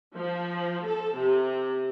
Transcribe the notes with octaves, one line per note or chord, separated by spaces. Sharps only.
F3
A4
C3